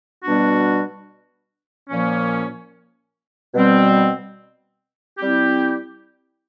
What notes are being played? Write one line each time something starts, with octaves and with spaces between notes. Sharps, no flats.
B2 G3 B3 D4 F#4
A#2 F3 A#3 C#4
B2 G3 C4
G3 C4 E4 G4